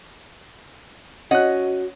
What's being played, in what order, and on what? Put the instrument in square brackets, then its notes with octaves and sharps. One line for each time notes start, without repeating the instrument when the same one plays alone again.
[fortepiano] C#4 F#6 [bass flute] F#4 [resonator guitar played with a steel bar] D#5 F#5